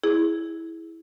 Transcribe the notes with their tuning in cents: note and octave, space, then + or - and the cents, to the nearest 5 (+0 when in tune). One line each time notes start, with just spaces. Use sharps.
E4 -10 G#4 +0